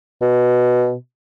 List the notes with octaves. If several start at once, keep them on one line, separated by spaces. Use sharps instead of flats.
B2